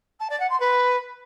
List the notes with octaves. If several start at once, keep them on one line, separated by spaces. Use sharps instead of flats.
A5
D5
F#5
C6
B4